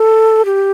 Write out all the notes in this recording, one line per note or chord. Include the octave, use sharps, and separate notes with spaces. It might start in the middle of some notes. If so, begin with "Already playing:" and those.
Already playing: A4
G4